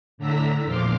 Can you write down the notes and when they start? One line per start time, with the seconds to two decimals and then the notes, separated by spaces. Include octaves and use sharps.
0.18 A2 D3 D4 A#5 E6 B6
0.64 E2 A#2 F3 C6 D6 F6